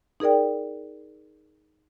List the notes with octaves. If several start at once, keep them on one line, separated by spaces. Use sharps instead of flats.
D#4 G#4 A#4 D5 G5